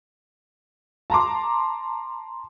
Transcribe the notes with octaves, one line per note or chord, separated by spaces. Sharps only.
A5 A#5 C6 D6